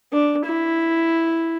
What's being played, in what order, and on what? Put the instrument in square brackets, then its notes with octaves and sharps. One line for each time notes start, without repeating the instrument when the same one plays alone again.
[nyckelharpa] D4
E4